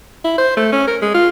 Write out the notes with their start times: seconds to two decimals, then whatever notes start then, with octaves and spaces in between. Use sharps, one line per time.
0.24 E4
0.38 C5
0.57 A3
0.72 C#4
0.87 A#4
1.02 G#3
1.14 F4